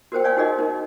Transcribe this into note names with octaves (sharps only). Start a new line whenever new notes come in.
F#4 A#4 C5 G5
C#5 D5 F5 G#5
D#4 F#4 G#4 A#4 D5 D#5
D#4 A#4